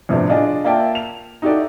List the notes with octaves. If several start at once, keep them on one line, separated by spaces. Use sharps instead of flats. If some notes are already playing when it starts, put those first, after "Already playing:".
F2 A2 C3 B3 D4
D4 F4 G#4 D5 D#5
A#3 F4 D5 E5 G5 A5
F7
D#4 E4 F#4 G4 A4 D5